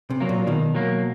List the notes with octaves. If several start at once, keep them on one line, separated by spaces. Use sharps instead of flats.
C3
F#3 A#3
A#2
B2 D#3
F#3 A#3